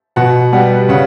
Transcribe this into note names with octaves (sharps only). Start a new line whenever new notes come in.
B2 F#5
G3 B3 F#5
C#3 F#5